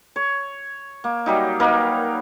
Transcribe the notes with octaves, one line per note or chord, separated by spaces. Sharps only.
C#5
A#3
F#3 G3 D#4
A#3 D#4 A#4 B4